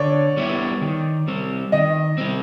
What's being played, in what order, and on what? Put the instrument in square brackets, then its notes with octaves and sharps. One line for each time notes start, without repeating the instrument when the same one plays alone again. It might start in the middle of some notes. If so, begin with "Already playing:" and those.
Already playing: [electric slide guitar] D3 [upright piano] C#5 D5
[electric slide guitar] G3 B3 E4
D#3
G3 C4
[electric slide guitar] D#3 [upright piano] D#5
[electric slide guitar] G3 C4